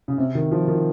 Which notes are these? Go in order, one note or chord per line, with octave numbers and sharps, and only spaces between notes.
C#3
C3
D#3
F3
D#3